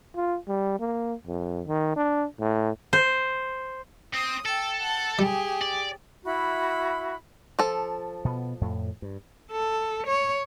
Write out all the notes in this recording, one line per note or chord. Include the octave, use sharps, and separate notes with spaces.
F4
G3
A#3
F2
D#3
D4
A2
C5
C4 D#6
A4 G5 E6
F#5 A5
G3 G4 G#4
D5
E4 F#4 E5 B5
F3 A4
B2 B3
F2 A2
G2
A4
C#5